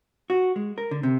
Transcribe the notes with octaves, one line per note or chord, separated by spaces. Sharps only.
F#4
G#3
A#4
D3
C3